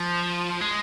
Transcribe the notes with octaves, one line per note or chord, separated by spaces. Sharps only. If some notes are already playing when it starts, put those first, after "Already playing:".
Already playing: F3
G#3